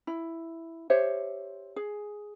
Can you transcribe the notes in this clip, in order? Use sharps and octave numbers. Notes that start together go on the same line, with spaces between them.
E4
G4 C5 C#5 E5
G#4